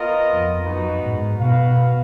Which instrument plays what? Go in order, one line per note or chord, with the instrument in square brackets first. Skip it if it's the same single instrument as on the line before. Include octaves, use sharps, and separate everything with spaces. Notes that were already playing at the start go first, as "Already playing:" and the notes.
Already playing: [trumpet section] B3 F4 A#4 D#5
[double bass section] F2
[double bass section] F#2 [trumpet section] B3 D#4 F#4 B4
[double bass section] G#2
[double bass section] B2 [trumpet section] F#4 B4 F5